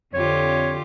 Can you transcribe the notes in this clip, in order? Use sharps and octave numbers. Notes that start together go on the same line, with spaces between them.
F2 D3 F4 G4 C#5